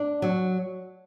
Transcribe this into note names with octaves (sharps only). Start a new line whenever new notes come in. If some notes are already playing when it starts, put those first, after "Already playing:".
Already playing: D4
F#3